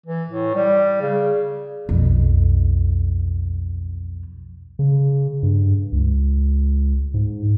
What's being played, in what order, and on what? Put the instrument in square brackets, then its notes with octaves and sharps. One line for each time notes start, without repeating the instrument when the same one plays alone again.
[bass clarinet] E3
A2
G3
C#3
[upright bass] B1 F2
[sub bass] C#3
G2
C#2
G#2